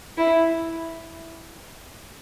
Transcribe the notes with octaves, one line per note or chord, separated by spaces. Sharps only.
E4